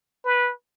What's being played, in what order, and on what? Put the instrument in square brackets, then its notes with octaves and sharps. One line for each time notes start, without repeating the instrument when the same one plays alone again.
[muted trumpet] B4